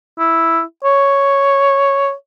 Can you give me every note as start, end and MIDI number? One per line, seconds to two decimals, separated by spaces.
0.19 0.62 64
0.84 2.13 73